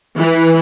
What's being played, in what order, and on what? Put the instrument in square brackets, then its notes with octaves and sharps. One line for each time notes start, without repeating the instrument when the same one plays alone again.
[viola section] E3